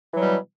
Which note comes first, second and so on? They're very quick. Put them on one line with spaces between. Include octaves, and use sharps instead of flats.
E3 F#3 G3 B2